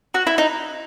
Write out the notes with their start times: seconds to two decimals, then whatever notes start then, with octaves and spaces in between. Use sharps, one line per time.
0.14 F#4
0.27 E4
0.38 D#4